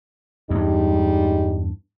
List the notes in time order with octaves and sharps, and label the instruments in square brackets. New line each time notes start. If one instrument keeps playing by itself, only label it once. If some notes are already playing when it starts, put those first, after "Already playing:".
[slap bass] E2 G2 [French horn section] G3 G#3 D#4